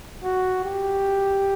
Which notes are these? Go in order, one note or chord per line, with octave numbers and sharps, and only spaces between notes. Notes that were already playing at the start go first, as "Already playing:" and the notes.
F#4
G4